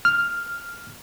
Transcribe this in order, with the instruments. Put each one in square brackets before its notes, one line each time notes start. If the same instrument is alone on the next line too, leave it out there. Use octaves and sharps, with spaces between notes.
[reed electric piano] F6